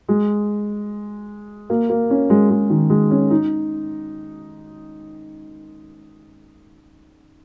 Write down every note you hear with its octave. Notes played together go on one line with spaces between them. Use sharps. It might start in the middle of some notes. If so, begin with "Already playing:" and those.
G#3
A#3
A#3
C#4
G#3
G#3
D#3
G#3
C#4
D#4